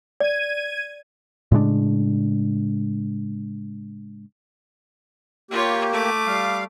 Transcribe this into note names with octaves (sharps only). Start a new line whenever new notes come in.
D5 G#6 D#7
A2 C#3 G#3 D4
A#3 F4 G4 C#5
A3 D6
G3 F5